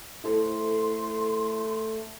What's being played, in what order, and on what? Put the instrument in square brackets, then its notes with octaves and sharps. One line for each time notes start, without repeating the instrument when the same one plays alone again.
[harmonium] A3 [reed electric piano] E4 A4 C5 [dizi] C6